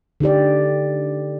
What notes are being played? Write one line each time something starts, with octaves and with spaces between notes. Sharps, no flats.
D3 D#4 G4 D5